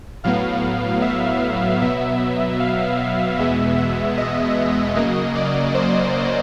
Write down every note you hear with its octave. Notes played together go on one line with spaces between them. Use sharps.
A2 F#3 B3 F5
E5
B2 F#3 B3 E5
F5
E2 B2 G#3 B3 E5
E5
D#5
C#3 F#3 A#3 D#5
D5
C5